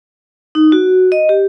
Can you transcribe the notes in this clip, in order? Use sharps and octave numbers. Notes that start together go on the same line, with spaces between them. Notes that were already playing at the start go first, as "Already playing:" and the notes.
D#4
F#4
D#5
G4